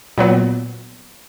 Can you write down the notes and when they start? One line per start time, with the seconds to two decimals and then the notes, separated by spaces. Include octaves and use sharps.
0.18 A#2 F#3 B3